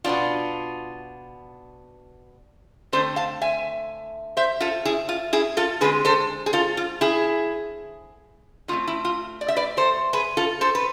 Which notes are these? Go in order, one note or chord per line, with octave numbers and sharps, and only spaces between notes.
B2 B3 D4 F4
D3 A3 C4 A4 C5
F5 A5
E5 G#5
C5 E5
F4 A4
E4 G#4
F4
E4 G#4
F4 A4
D3 G#3 C4 G#4 B4
A4 C5
G#4
F4 A4
F4
E4 G#4
B2 F4
A3 C4
E4
F4
D5
E5
B4 D5
A4 C5
G#4 B4
F4 A4
A4 C5
B4